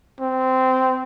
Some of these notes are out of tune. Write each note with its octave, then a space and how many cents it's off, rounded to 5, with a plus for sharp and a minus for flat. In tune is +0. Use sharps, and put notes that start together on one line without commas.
C4 -15